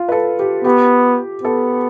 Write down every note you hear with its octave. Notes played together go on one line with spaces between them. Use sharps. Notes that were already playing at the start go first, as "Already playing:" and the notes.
Already playing: F4
B4
A4
G4
B3 G4
B3 A4